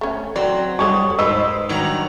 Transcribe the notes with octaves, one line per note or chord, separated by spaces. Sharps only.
A3 C#4
F#3 C4 D5
G3 A4 C#5 D#5 C#6 D#6
G#2 B4 C5 D#5 E6
G2 D#3 F#3 C#5 D5 A#5